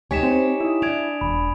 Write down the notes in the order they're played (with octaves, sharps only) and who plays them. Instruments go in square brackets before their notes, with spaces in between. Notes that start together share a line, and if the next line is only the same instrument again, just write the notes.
[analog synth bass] D2 [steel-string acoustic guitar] D#4 G4 C#5 [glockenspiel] G#5 B6 E7
[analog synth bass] C4
[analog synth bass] E4 [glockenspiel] D#6 E7
[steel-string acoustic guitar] D4 [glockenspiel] G#6 D7 F7
[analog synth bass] E1 [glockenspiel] B5